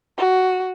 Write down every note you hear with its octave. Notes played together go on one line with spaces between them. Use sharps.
F#4